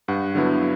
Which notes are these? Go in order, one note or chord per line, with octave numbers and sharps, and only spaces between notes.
G2 F#5
D3 F#3 B3 E4